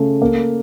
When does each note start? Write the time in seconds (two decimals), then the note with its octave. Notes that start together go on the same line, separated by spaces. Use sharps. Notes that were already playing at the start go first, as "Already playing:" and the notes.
Already playing: C#3 A3
0.22 A#3